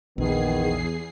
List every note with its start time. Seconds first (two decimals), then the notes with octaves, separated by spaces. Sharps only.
0.18 A#1 E2 D#3 B3 G#4 C7